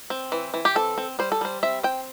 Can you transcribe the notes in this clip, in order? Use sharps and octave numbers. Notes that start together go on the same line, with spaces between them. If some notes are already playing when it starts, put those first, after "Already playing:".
C4
E3
E3
G4
C4 A4
C4
G3 C5
A4
G3 C5
C4 E5
C4 G5